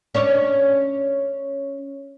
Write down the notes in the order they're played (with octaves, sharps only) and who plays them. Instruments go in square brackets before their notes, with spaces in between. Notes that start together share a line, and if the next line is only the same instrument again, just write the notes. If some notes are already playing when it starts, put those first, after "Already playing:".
[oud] C#4 D4 C#5